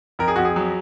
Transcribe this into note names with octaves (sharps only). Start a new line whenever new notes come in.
F2 A#4
G#4
F2 F#4
G#4
F#3